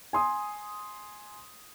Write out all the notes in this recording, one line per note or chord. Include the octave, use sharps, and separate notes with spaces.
G#5 C6 D#6